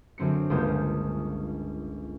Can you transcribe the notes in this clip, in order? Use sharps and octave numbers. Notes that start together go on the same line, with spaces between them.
F#2 D3 C4 C7 C#7
G1 C#2 A#3 C6 D#6 G6